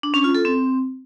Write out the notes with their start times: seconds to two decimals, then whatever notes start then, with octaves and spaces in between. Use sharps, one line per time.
0.03 D4
0.14 C#4
0.24 F4
0.35 A4
0.45 C4